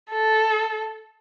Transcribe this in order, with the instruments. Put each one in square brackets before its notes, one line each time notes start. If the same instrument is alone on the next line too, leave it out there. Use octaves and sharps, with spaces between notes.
[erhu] A4